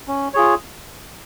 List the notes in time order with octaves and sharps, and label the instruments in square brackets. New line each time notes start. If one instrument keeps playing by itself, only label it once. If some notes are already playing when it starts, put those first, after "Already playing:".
[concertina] C#4
F4 G#4 C#5